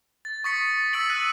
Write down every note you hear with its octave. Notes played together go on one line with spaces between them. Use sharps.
A6
C#6 D#6 A6 B6 C#7
E6 A6 B6 D7 F#7
F#6 D#7